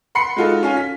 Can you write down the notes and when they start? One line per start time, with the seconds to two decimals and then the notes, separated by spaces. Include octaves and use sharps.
0.15 F#5 B5 C6 C7 C#7
0.36 G#3 D#4 F4 F#4 A4
0.63 C#4 F4 F5 G#5
0.77 B6